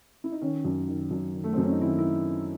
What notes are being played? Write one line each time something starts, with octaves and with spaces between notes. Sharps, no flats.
E4
D#4
D#3 C#4
F#2
D#3
F#2
D#3
A3
C4
F#2
C#4
D#4
D#3 E4
E4